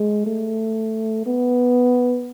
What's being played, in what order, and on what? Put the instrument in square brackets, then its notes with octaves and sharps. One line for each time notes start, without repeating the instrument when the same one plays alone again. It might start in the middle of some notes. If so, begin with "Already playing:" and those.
Already playing: [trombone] G#3
A3
B3